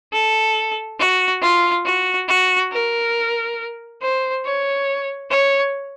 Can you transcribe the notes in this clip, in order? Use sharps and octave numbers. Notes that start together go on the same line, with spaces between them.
A4
F#4
F4
F#4
F#4
A#4
C5
C#5
C#5